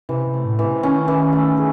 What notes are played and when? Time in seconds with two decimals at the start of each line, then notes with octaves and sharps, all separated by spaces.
0.09 C3 E3
0.27 C3
0.34 A3
0.45 A2
0.59 E3
0.65 C3
0.82 D#3 C#4
1.08 E3
1.33 A3
1.57 D#3 G#4